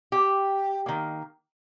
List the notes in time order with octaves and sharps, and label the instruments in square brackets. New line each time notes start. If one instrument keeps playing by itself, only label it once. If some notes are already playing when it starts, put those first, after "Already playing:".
[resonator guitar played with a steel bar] G4
D#3 A#3